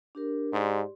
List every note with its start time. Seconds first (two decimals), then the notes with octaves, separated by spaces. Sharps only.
0.15 D4 G4 A#4
0.53 G#2 G4 D5 C6